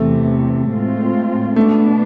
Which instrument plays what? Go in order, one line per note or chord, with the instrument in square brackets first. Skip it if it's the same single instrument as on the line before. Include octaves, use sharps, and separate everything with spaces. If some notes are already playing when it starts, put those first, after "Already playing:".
Already playing: [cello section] E2 C3 E3 [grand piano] A3
[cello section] A2 G#3 C4 F4
[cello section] B2 B3 D4 [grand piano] A3